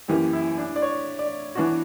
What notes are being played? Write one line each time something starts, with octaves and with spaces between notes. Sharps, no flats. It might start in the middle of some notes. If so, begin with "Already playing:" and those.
F#2 E3 A#3 G4
E4
D4
D5
C#5
D5
E3 B3 D4 F#4